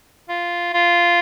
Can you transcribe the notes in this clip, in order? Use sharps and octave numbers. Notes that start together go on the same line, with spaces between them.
F4
F4